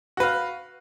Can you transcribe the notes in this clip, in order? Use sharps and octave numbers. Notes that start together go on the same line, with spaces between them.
F#4 B4 F5